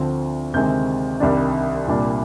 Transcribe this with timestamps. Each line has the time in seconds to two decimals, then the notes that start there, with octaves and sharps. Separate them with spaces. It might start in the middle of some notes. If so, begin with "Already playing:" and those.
Already playing: D2 D3 F3 C4
0.53 D2 C3 D#3 G#3 C4 G6
1.20 C2 C3 D#3 G3 D4
1.88 C2 A#2 G3 D4